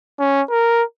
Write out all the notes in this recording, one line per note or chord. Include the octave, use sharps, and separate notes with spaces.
C#4
A#4